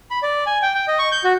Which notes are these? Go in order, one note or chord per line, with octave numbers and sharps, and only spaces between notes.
B5
D5
G#5
G5
G5
D#5
C#6
G6
F#4